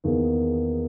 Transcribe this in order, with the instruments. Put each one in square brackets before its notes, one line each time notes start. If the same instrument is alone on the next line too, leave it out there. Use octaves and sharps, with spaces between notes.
[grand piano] E2 D#3 A#3 D#4 G#4